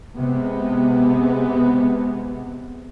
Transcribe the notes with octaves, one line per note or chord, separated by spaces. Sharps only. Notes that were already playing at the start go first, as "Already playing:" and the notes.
C3 G#3 B3